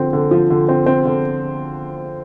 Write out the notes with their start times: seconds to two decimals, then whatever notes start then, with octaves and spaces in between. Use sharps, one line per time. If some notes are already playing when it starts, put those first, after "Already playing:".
Already playing: D3 F3 C4
0.13 D3
0.31 F3
0.50 D3
0.69 C4
0.86 C4
1.05 D3